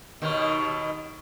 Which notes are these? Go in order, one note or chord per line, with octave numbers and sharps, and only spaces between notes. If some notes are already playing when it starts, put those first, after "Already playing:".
D#2 B2 D#3